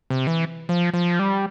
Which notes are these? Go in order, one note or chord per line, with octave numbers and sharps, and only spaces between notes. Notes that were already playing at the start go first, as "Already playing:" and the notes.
C3
E3
F3
F3
G3